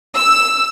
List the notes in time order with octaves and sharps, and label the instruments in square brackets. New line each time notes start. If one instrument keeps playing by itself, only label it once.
[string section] E6